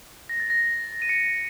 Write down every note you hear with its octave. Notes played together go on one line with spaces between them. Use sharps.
A#6
A6
A#6
D#7
C#7